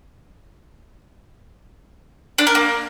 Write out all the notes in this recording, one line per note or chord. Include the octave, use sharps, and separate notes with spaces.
D4
A#4
A#3